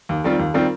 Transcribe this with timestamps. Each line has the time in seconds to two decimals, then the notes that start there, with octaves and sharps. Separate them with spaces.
0.09 D#2
0.24 D#3 G3 C4 F4
0.39 D#2
0.54 D#3 G3 C4 F4